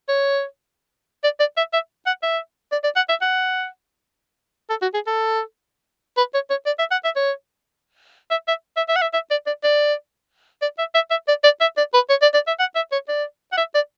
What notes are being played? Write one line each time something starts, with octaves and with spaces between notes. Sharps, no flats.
C#5
D5
D5
E5
E5
F#5
E5
D5
D5
F#5
E5
F#5
A4
F#4
G#4
A4
B4
C#5
C#5
D5
E5
F#5
E5
C#5
E5
E5
E5
E5
F#5
E5
E5
D5
D5
D5
D5
E5
E5
E5
D5
D5
E5
D5
B4
C#5
D5
D5
E5
F#5
E5
C#5
D5
F#5
E5
D5